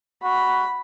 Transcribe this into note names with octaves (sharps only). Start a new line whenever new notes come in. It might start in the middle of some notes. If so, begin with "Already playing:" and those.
F#4 B5